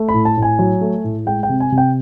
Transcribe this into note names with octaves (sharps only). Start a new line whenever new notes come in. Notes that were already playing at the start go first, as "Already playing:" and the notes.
Already playing: A3
B5
A2
A5
A2
G#5
F#3
A3
A2
G#3 G5
G5
C3
G#5
C3
G5